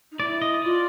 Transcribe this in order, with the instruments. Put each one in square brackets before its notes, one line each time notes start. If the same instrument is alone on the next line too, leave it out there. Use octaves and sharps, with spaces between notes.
[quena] D#4
[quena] E4 [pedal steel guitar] D5
[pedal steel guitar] D#5
[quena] F4 [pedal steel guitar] D5